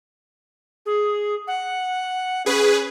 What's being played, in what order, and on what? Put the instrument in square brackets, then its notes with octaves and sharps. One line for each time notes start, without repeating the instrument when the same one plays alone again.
[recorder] G#4
F#5
[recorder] C#4 [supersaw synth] G#4 B4